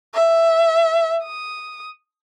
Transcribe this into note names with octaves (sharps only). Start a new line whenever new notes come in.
E5
D#6